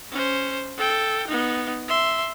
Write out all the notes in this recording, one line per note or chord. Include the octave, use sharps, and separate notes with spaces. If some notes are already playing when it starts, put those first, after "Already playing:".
C#4 C5
A4 G5
B3 D#4
E5 C6